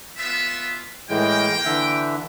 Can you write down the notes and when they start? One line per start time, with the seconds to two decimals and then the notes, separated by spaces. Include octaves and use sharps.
0.17 B3 F4 E5
1.10 A2 E3 G#3 A#3 G5
1.65 D3 E3 E5